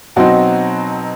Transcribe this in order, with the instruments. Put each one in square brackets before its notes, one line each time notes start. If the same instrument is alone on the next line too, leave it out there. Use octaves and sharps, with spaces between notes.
[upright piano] B2 F#3 C4 D#4 F#4